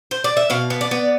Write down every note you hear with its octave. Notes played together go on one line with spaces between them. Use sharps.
C5
D5
E5
B2 F5
B3
D5
B3